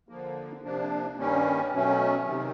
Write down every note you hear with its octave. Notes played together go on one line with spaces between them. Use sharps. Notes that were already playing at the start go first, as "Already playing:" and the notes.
D3 F3 A#3
C3 F3 A#3 D4
G2 D#3 G3 A#3 C#4
B2 F#3 A3 C#4
C3 D#3